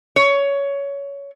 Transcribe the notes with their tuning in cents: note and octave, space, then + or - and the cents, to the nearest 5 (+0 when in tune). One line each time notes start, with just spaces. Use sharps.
C#5 +15